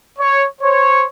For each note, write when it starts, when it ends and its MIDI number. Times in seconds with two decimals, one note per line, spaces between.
0.17 0.43 73
0.60 1.04 72
0.60 1.04 73